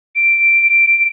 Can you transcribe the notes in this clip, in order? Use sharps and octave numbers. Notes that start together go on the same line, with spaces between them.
D7